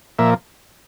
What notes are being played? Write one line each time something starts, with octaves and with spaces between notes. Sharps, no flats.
A#2 F3 A#3 E5